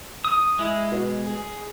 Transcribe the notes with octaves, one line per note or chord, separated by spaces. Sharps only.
D#6
G#3 E4
B2
G#4